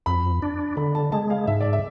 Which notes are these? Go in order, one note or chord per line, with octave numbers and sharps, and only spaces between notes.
F2 B5
D4
D3 B5
A5
G#3 A5
F5
G#2 E5
D5
E5